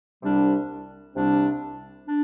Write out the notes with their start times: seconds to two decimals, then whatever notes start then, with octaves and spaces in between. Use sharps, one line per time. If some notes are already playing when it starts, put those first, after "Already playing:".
0.23 C2 C3 G3 D4
1.16 C2 C3 G3 D4
2.08 D4